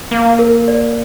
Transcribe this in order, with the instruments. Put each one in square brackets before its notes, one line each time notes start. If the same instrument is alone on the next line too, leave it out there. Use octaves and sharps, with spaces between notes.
[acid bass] A#3
[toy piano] A#4
D5